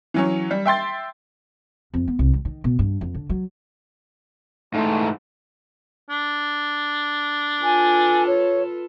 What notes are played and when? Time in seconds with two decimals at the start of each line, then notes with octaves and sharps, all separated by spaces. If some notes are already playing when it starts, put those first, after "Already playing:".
0.14 E3 F#3 C#4
0.51 G3
0.65 E5 G5 C6 A6
1.94 F2
2.08 B3
2.19 C2
2.33 G3
2.45 D#3
2.64 B2
2.79 G2
3.01 F2
3.14 D3
3.29 F#3
4.74 G#2 E3 A3
6.10 D4
7.63 F4 A4 B4 G#5
8.27 C#5